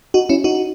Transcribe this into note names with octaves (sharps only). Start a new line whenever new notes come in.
D#4 F#4
C#4 E4
D#4 F#4